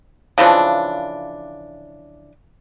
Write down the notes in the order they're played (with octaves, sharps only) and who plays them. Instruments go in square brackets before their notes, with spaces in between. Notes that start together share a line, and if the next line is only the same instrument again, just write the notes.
[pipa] C#3 E3 F3 D4